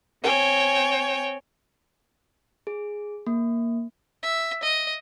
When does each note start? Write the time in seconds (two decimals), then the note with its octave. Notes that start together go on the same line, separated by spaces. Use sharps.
0.22 C4 C#5 G5 G#5
2.67 G#4
3.27 A#3
4.23 E5
4.63 D#5